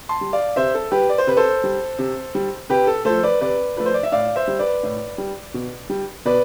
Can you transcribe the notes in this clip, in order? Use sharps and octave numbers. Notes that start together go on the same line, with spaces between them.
A5 C6
G3
D5 F5
C3 C5 E5
A4
G3 G4 B4
D5
C5
C3 B4
A4 C5
G3
C3
G3
C3 G4 B4
A4
F3 A3 A4 C5
B4 D5
C3 B4 D5
F3 A3 B4
C5
D5
E5
A2 D5 F5
C5 E5
G3
B4 D5
A2
G3
B2
G3
B2 B4 D5